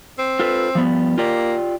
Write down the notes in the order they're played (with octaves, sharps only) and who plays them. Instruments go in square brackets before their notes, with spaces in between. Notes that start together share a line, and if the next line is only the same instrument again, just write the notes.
[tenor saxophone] C4
[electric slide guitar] F4 A4 B4
F3 G3 B3
[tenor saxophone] A#3 [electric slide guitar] F4 G4 D5